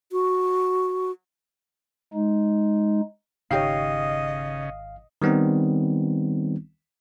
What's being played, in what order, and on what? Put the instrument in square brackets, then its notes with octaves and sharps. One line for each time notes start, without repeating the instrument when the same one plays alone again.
[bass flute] F#4
[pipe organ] G#3 D#4
[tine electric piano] G#1 F5 C7 [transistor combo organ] C#3 [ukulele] D#4 G4 C#5 [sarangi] D#5
[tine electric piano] D#3 G3 B3 C4 D#4